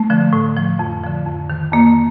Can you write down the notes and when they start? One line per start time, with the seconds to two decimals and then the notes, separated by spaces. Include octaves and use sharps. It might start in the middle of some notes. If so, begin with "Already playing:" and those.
Already playing: A3
0.10 D3 F3
0.33 A2
0.57 F3
0.79 F2
1.03 D3 F3
1.27 F2
1.50 D#3
1.73 F2 A#3